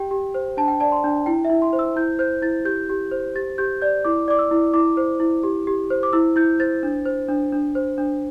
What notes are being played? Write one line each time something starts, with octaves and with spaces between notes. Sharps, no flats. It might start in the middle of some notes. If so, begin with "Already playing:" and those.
Already playing: G4 G5
G4
C5
D4 A5
G5
D5 A5
C6
D4
E4 G5
E4 E5
C6
C5
E6
E4 G6
C5 G6
E4 A6
G4 G6
G4
C5
G4 A6
G4 G6
D5 G6
E4 D6
D5 D6
E6
E4
E4 D6
C5
E4
G4
G4
C5
D6
E4 E6
E4 G6
C5 A6
D4
C5
D4
D4
C5
D4